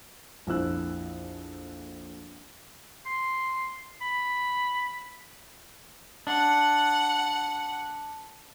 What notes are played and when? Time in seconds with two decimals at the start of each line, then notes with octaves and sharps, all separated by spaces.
0.47 A#1 F2 E4 E6 F#6
3.06 C6
4.02 B5
6.27 D4 F#5